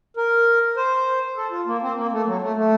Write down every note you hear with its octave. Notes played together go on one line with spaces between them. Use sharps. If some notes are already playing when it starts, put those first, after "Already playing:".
A#4
C5
A4
F4
A#3
C4
A#3
A3
F#3
A3
A3